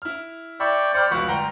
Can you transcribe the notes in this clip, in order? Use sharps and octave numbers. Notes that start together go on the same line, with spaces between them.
E4 F6
D5 E5 G5 B5 C#6
C5 D5 G5 B5 F6 C#7
F1 C#2 F#4 F#5 B5
G1 G5 A#5 C6